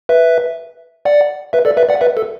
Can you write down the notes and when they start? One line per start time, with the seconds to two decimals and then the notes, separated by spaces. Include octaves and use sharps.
0.09 B4 E5
1.05 D5 F#5
1.53 B4 E5
1.65 A4 D5
1.77 B4 E5
1.89 D5 F#5
2.01 B4 E5
2.17 A4